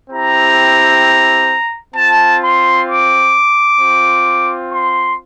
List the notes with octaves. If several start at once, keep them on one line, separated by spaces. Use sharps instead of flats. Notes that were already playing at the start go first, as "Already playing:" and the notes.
C4 E4 G4 A#5
C4 F4 A5
C6
D6
C4 F4
C6